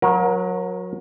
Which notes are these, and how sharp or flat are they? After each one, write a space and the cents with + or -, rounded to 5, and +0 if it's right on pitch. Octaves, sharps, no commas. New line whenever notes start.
F#3 -25 A#4 +25